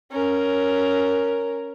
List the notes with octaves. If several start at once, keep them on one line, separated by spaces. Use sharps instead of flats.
C#4 A#4